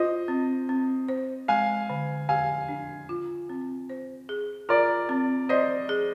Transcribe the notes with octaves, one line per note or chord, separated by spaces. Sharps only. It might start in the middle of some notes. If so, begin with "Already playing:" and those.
Already playing: F4 C5 D#5
C4
C4
C5
G#3 F5 G#5
D3
G4 F5 G#5
D4
F4
C4
C5
G#4
F4 A#4 D5
C4
C5 D5 D#5
G#4